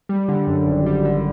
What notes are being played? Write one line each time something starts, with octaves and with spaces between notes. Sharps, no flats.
G3
D3
F#2
G#1
G3
D3